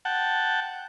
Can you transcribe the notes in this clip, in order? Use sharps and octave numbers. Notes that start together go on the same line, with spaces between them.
F#5 G5 A5